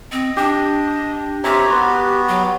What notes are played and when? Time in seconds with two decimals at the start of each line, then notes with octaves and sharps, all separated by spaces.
0.12 C4 D#5
0.37 D4 G4
1.44 C4 G4 A#4 C5 C#5 E5 A#5
1.66 B3 F#4 B4 C6
2.28 F#3